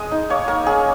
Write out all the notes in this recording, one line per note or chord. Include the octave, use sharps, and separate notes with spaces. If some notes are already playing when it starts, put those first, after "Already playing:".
Already playing: G#3 D#5
D#4
A#3 C#5
A#3 A#4
C#4 G#4